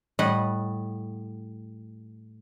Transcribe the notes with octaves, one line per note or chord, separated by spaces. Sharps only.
A2 G3 D#5 F#5